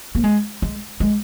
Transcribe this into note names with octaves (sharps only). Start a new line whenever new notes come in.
A#3
G#3
G#3
G#3